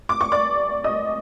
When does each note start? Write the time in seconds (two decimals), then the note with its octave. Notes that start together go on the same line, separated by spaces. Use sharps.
0.09 D6
0.21 C#6
0.32 D5 D6
0.84 D#5 D#6